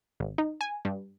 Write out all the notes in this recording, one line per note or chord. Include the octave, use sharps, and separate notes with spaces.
G#1
D#4
G#5
G2